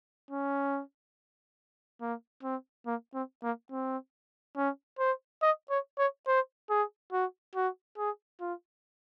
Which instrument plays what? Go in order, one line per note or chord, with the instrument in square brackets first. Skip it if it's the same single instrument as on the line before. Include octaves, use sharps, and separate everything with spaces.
[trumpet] C#4
A#3
C4
A#3
C4
A#3
C4
C#4
C5
D#5
C#5
C#5
C5
G#4
F#4
F#4
G#4
F4